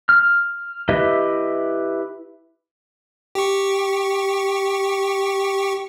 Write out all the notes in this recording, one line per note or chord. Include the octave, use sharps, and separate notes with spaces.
F6
E4 G4 B4 D#5 E5
G4 C#6